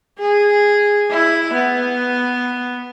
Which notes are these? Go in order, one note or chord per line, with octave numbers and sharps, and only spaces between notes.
G#4
E4
B3